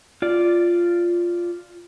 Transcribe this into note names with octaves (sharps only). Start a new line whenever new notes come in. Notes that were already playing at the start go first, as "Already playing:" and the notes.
F4 D5